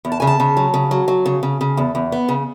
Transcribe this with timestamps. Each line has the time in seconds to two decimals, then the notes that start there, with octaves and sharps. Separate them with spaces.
0.05 E2
0.12 A5
0.20 C#3 G#5
0.27 A5
0.40 C#3
0.57 F#3
0.74 C#3
0.91 F#3
1.08 F#3
1.26 C#3
1.43 C#3
1.61 C#3
1.77 E2
1.95 E2
2.12 B3
2.29 C#3